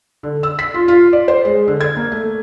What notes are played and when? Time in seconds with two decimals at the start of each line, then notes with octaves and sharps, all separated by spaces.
0.23 D3
0.43 E6
0.59 B6
0.74 F4
0.88 F4
1.13 D5
1.28 C5
1.45 G#3
1.68 D3
1.81 G#6
1.97 A#3
2.12 A3